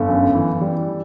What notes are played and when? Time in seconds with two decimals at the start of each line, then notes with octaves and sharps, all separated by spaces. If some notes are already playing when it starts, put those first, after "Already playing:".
Already playing: G1 A4
0.09 F#2
0.34 E3
0.61 G3